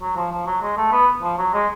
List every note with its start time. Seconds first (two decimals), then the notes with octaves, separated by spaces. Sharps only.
0.01 F#3
0.16 F3
0.31 F3
0.46 F#3
0.62 G#3
0.77 A3
0.92 B3
1.22 F3
1.38 F#3
1.53 G#3